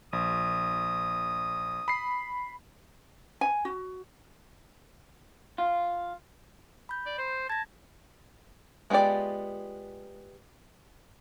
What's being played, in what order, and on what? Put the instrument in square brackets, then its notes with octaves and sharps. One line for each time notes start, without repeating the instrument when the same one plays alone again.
[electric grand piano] A#1 [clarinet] D#6
[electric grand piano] B5 C7
[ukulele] G#5
F#4
[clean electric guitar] F4
[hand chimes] B5 G6
[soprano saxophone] D5
C5
[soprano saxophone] A5 [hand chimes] G#6 A#6
[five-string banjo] G#3 B3 F4 G4 D5